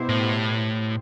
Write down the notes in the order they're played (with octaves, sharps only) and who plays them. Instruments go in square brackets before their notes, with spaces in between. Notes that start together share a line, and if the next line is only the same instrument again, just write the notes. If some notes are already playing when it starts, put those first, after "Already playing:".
Already playing: [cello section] B2 B3 E4 G4 C5
[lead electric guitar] A2